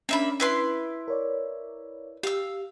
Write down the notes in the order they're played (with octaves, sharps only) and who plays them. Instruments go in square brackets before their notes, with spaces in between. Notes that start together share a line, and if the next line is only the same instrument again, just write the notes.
[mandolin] A#3 E5 B5 [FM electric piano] C#4 D4
[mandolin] E4 B4 C6
[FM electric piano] A#4 C#5 D5
[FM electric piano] G4 [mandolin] F5 E6